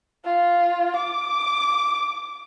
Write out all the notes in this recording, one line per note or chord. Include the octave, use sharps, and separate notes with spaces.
F4
D6